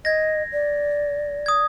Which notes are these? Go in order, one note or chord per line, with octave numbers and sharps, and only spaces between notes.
D#5 G#6 A#6
D5
D#6 G#6